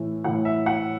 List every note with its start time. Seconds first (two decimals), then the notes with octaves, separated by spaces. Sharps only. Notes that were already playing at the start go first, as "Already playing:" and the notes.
Already playing: A2 E3 A3
0.24 A2 E3 A3 F#5
0.45 E5
0.66 F#5